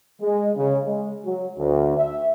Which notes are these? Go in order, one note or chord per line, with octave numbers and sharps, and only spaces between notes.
G#3
C#3
G#3
F#3
D2
E5